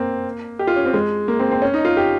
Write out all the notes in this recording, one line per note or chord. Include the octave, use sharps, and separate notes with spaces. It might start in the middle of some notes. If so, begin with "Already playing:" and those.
Already playing: A#3 C4
G4
F4
C#4
C4
G#3
A#3
C4
C4
C#4
D#4
F4
G4